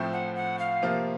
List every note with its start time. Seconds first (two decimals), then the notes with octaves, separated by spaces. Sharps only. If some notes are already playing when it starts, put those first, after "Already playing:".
Already playing: A2 F3 A3 C4
0.13 F#5
0.36 F#5
0.59 F5
0.82 C3 F3 A#3 F4